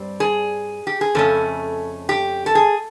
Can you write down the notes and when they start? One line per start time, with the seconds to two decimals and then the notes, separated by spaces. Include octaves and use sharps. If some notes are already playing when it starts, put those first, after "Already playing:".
Already playing: G2 G3 C4
0.20 G#4
0.87 G4
1.01 G#4
1.15 F2 C#3 A3 C#4 A4
2.09 G4
2.46 A4
2.55 G#4